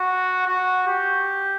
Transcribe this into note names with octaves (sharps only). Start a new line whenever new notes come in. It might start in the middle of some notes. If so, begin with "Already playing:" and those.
Already playing: F#4
F#4
G4